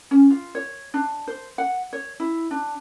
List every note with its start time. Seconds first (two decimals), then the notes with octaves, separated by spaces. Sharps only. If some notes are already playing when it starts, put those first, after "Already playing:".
0.11 C#4
0.31 F4
0.55 C#5
0.94 D4
1.28 C5
1.58 F#5
1.93 C#5
2.20 E4
2.51 D4